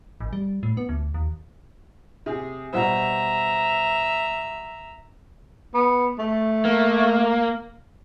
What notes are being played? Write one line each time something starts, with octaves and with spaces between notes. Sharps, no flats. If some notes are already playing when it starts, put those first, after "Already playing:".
G#1
G3
A2
B3
D2
D#2
C3 G#4
B2 G3 C5 E5 A#5
B3
A3
A#3